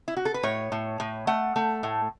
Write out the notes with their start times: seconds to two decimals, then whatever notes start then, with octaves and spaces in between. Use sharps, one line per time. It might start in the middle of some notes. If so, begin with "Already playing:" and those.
0.08 E4
0.17 F#4
0.25 A4
0.34 B4
0.43 A2 C#5
0.72 A2
1.00 A2
1.27 A3 F#5
1.56 A3
1.83 A2